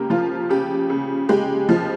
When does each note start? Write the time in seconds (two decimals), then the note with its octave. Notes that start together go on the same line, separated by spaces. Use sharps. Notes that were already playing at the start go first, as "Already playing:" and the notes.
Already playing: C#3 A#3 G4 A#4
0.10 F3 F4
0.50 C#3 G4
0.90 C#3
1.29 G#3 G4
1.69 F3